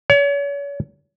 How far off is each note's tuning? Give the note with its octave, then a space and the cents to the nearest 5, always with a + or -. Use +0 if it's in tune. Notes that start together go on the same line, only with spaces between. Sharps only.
C#5 +40